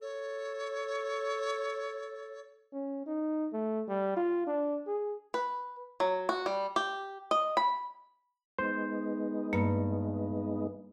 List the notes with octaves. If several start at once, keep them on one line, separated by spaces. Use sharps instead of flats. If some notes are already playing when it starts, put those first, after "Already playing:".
A4 C#5
C#4
D#4
A3
G3
F4
D4
G#4
B4
F#3
F#4
G3
G4
D#5
B5
G#3 B3 D#4 C5
G2 A#3